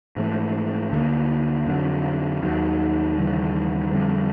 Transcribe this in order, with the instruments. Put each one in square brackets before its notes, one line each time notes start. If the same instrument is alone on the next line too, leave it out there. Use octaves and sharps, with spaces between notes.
[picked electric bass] G#2 E3 A3
D2 D3 F3 A#3
F2 D3 F#3
D#2 D#3 F#3
D#2 C#3 E3 G3
F2 D3 G3